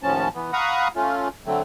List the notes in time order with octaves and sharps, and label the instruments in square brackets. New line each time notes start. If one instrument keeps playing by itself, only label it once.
[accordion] D#2 A2 F3 C#4 A5
E3 B3
F5 F#5 A#5 B5 C#6 D#6
A3 C#4 F4
D3 F#3 A3 C4